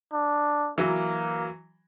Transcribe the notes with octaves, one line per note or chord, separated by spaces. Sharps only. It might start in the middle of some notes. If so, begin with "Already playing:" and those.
D4
E3 F#3 A#3